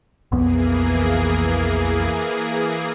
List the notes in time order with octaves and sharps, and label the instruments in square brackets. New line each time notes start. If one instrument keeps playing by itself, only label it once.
[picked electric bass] B1 F2 B3 [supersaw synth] E3 A#3 G#4